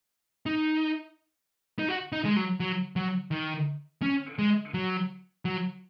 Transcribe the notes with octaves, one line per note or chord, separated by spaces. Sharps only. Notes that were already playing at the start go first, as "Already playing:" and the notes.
D#4
D#4
F#4
D#4
G#3
F#3
F#3
F#3
D#3
C#4
G#3
F#3
F#3